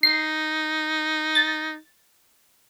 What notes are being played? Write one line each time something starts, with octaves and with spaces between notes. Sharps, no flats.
D#4 C7
A6